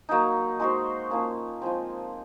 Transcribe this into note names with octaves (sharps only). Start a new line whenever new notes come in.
F#3 A#3 D#4
G#3 D#4 F#4 C5
F3 A#3 C#4
F3 G#3 C4